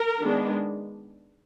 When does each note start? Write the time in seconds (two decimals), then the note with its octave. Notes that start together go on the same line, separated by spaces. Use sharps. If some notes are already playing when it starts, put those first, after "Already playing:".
Already playing: A#4
0.22 D#3 G#3 B3 D4